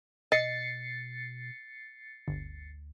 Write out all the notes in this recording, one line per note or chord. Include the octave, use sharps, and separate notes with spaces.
B2 D#5 D#6 A6 A#6 C7 C#7
G1 D2